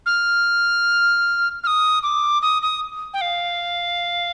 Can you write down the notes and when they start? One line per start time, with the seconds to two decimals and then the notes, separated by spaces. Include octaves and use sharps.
0.06 F6
1.64 F6
1.67 D#6
2.03 D6
2.42 D#6
2.62 D#6
3.14 G5
3.21 F5